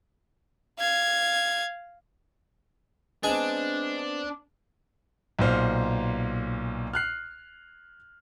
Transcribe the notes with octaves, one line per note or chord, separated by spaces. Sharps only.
F5 G#6
G#3 B3 C4 D4 G#5
B1 A#2 C5 F6
F6 F#6 C7